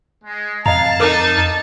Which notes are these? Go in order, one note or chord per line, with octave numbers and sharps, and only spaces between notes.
G#3
F2 D#5 F5 A5 A#5
D#4 A4 A#4 D6